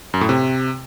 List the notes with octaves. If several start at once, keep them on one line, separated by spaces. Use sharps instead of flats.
F#2
A2
C3